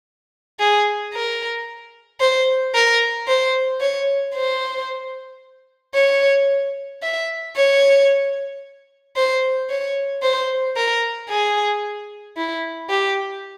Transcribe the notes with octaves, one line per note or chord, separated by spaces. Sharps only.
G#4
A#4
C5
A#4
C5
C#5
C5
C#5
E5
C#5
C5
C#5
C5
A#4
G#4
E4
G4